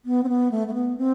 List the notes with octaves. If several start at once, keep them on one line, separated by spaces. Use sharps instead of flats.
B3
C4
B3
A3
A3
B3
C4